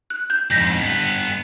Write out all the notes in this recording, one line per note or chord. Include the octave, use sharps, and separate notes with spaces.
F#6
G6
F2 G#2 G6 A#6 B6
G2 B3